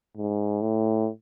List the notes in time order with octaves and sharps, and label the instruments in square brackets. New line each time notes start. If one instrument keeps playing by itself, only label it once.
[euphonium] G#2
A2